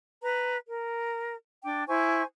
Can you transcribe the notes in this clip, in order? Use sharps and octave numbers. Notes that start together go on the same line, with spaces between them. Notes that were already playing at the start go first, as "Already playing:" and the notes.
B4 A#5
A#4
D4 G5 D6
E4 C5 G#5 C#6